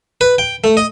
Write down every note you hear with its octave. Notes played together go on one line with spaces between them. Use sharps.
B4
G5
A3
D#5